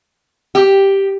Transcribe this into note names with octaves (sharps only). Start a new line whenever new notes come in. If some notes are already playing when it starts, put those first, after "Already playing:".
G4